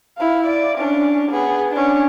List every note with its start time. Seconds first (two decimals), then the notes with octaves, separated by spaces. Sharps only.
0.18 E4 F5
0.46 D5
0.78 C#4 D4
1.31 B3 G#4
1.73 C#4 D4